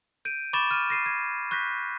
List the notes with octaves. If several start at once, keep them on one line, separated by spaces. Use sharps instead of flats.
G6 D7 D#7
B5 C#6 D6 A6 E7
F6 D#7
A#6 C7 D#7
G#6
C#6 F#6 G6 A#6 B6